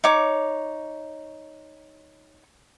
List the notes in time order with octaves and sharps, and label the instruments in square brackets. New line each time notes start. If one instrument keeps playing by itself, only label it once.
[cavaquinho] D#4 C#5 D6